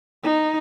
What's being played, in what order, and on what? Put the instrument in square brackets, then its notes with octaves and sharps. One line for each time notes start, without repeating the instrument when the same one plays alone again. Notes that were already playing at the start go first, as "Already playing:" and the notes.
[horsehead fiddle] D#4